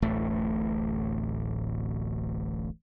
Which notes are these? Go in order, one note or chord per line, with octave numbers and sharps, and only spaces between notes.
D1 A1 A3